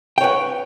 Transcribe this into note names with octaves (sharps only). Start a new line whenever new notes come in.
B4 C#5 G5